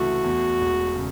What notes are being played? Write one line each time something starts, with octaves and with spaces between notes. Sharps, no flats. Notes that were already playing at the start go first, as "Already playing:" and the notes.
Already playing: C#2 C3 E3 A3 F#4
E2
E1
C#3